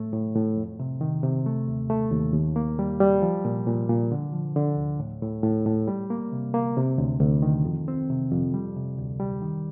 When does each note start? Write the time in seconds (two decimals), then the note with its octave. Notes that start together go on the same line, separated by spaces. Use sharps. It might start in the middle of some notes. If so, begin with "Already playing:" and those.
Already playing: A2 A3
0.13 A2
0.35 A2
0.57 F2
0.79 C3
1.01 D#3
1.23 C3
1.46 A3
1.67 D#2
1.90 A3
2.11 D#2
2.33 D#2
2.56 A#3
2.79 G3
3.00 G3
3.22 F3
3.45 A#2
3.67 A#2
3.89 A#2
4.12 D3
4.33 F3
4.56 D3
4.77 D2
5.00 A2
5.22 A2
5.43 A2
5.65 A2
5.88 G3
6.10 A#3
6.32 C3
6.54 A#3
6.77 C3
6.99 D2
7.20 D2
7.42 D#3
7.65 F2
7.88 C4
8.10 C3
8.32 F2
8.54 G3
8.76 C3
8.98 D2
9.20 G3
9.42 D#3